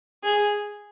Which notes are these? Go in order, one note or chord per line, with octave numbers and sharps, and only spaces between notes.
G#4